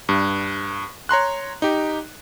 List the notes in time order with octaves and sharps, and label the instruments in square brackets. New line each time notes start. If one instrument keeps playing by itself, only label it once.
[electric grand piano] G2
C#5 A#5 C6 F#6
D#4 G4